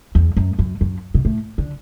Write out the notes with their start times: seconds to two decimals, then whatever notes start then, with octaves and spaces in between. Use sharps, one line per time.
0.15 E2
0.37 F#2
0.59 F#2
0.81 F#2
1.14 B2
1.25 A2
1.58 D3